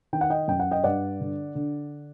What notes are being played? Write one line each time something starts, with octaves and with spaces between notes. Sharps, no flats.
D#3 G5
F#5
D#5 G5
F#2 G5
F#5
D#5 G5
G2 D5 F#5
D3
D3